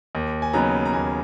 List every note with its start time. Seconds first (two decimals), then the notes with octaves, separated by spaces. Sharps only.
0.15 D#2
0.42 G#5
0.53 C#3 F#3 B3 D#4 A#5
0.86 A#5
0.93 D#2 G#5